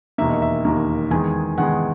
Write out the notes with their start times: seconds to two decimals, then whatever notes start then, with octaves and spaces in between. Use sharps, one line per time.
0.18 E1 D#2 D#3 A#3 E5
0.29 D#5
0.42 E5
0.65 E1 D#2 D#3 A#3
1.11 E2 D#3 G#3 G#5
1.58 E2 D#3 G#3 F#5